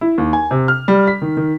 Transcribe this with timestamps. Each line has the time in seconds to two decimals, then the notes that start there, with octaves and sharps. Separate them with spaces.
0.01 E4
0.18 D#2
0.33 G#5
0.51 C3
0.68 F6
0.88 G3
1.07 B6
1.22 D#3
1.37 D#3